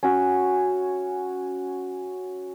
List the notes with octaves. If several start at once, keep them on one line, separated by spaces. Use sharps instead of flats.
C#4 F#4